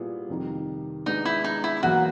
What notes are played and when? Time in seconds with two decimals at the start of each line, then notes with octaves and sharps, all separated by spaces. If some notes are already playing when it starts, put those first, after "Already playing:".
Already playing: A#2 G3 B3 E4 G#4
0.29 F2 C3 D#3 G3
1.06 G#3 B3 D4 D#4
1.25 E4
1.44 D#4
1.64 E4
1.83 E2 B2 F#3 A#3 F#4